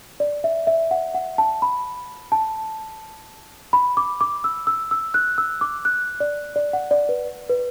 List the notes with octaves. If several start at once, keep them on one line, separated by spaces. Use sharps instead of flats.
D5
E5
E5
F#5
F#5
A5
B5
A5
B5
D6
D6
E6
E6
E6
F#6
E6
D6
F#6
D5
D5
F#5
D5
B4
B4